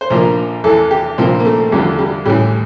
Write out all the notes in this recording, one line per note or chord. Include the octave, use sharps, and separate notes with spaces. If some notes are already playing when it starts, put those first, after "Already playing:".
C5
A#1 A#2 F3 A#4
E2 E3 A4
G4
A#1 A#2 F3 C4
A#3
A3
E2 D3 F3 G3
G3
A1 A2 E3 G3